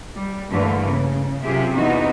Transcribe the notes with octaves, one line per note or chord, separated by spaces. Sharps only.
G3
G2 D3 E3 A3 A#3
C#3
F#2 C3 F4 G4 G#4 E5
E2 C3 E3 B3 D#4 F#4